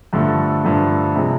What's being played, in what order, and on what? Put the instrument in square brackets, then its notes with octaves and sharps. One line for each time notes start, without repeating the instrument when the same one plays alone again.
[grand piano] G2 D3 F3 A3
G2 D3 F3 A3
C3 F3 G#3